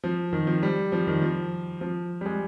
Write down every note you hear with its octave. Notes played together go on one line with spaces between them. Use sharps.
F3
D#3
F3
G3
F3
D#3
F3
F3
G3
G#3